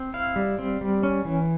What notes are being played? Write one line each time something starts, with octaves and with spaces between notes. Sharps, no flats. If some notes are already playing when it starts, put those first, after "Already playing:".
Already playing: C4
E4 F5
G3
C4
G3
C#4
E3